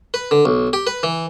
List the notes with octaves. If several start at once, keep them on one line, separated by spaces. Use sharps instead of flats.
B4
D3
B1
G4
B4
E3